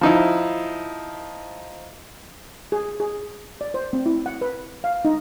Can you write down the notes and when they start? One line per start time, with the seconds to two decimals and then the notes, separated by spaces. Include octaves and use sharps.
0.01 F3 D#4 E4
2.72 G#4
3.00 G#4
3.61 D5
3.74 C5
3.93 C4
4.06 E4
4.26 F#5
4.42 B4
4.84 F5
5.05 D#4